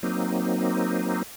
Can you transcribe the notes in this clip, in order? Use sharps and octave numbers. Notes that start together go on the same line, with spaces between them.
F#3 A#3 C4 D#4